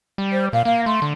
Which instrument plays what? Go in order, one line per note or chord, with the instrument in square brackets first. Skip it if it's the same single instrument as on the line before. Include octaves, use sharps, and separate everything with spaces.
[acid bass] G3
[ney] C5
[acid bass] A#2 [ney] F5
[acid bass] A#3 [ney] F5
[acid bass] A3 [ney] C6
[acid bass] D3